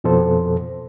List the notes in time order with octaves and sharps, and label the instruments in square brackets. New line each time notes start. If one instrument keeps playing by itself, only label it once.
[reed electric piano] F2 B2 F3 A4 C5